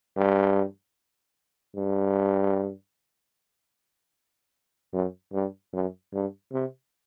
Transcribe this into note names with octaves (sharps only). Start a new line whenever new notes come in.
G2
G2
F#2
G2
F#2
G2
C3